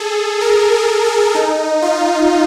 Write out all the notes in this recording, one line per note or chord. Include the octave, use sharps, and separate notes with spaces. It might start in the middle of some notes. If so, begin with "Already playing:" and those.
Already playing: G#4 A4
A#4
A4
A4
D#4
F4